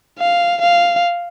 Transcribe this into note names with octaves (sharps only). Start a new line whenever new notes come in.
F5
F5